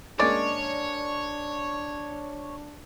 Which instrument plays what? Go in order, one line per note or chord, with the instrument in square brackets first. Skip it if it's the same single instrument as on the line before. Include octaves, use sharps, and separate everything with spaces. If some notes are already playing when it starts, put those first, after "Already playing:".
[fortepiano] G#3 A#3 C#4 [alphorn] D4 [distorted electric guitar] C#5 [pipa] D5